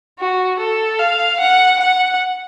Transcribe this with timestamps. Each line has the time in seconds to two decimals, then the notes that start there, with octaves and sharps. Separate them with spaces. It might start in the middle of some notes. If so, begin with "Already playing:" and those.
0.20 F#4
0.60 A4
1.00 F5
1.41 F#5
1.80 F#5